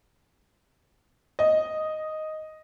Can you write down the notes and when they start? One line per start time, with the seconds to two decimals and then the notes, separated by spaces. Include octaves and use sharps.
1.39 D#5